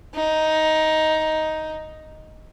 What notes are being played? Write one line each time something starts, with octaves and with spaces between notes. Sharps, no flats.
D#4